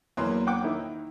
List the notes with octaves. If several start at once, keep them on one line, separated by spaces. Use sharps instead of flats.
E2 F#3 A#3 C6
F#5 G5 D6
D#3 E4